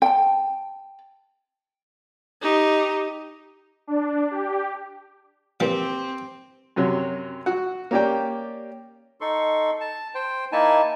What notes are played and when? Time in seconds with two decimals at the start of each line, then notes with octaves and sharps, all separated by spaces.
0.02 G5 A5
2.42 D#4 G4
3.87 D4
4.31 G4
5.60 A#2 E3 F3 C4 G4
6.76 F#2 C3 F#3
7.46 F#4 F#5
7.91 A#3 C#4 G4 D5 G5
9.21 D#4 A4 C6 C#6
9.80 A5
10.15 C5 G5
10.52 A#3 D#4 E4 G#5 A5